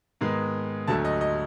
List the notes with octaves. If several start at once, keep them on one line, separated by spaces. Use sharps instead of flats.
G#2 D#3 G#3 B3
D2 D3 F#3 A3 A5
D#5
D#5